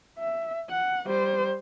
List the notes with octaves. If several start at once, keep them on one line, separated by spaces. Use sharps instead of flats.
E5
F#5
G3 C5